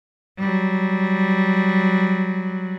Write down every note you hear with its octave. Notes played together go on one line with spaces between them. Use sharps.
F#3 G3